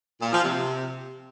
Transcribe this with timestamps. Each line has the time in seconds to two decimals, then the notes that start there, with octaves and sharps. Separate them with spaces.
0.20 A#2
0.31 F3
0.43 C3